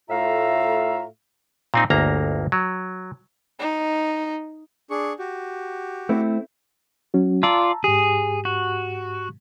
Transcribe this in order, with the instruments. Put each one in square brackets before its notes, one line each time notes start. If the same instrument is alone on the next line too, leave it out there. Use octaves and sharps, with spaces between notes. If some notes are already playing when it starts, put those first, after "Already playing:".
[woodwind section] A2 A3 F4 E5 F5 A#5
[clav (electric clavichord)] A#2 C4 D#4
G1 D2 A#3 A#5
F#3
[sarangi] D#4
[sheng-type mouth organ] D4 G#4 C#6
F#4 G4
[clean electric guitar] A3 C4 E4
[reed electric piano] F#3 C#4 F#4
[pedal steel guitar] F4 D5 [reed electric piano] A5 A#5 E6
[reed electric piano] G#2 G4 [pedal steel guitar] G#4
[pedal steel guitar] F#4